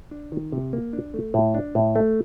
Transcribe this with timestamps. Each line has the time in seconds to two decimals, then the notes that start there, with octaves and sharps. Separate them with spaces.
0.11 D4
0.32 D#3
0.52 C3
0.73 A#3
0.93 D4
1.14 A3
1.34 A2
1.54 D4
1.75 A2
1.96 A3